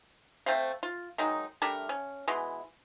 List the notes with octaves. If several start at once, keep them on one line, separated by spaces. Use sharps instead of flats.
A3 C4 C5 F5
F4
D#3 F#3 G#3 D#4
G3 A3 D4 A#4
C#4
B2 E3 G#3 C6